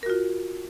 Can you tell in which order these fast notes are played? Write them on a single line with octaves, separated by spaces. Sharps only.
A#4 F#4 F4